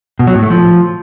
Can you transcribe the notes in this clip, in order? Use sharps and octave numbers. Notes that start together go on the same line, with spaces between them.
B2
F#3
A2
A3
F3